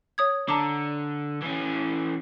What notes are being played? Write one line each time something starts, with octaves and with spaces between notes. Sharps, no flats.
C#5 D#6 G#6
D3 A5 A#5 D6
E3 C#4